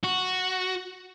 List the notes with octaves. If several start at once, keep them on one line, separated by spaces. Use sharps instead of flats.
F#4